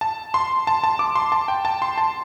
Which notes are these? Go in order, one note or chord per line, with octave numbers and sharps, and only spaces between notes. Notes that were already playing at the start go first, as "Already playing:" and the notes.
A5
C6
A5
A5
D6
C6
A5
G5
A5
C6
A5